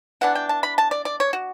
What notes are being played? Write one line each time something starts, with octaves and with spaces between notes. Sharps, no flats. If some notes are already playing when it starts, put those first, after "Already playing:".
E3 B3 D4 F#5
G5
A5
B5
A5
D5
D5
C#5
F#4